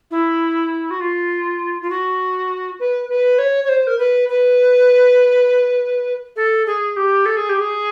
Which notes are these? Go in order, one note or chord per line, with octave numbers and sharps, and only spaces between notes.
E4
F#4
F4
F4
F#4
B4
B4
C#5
C#5
C5
A#4
B4
B4
A4
G#4
G4
A4
G#4
G4
G#4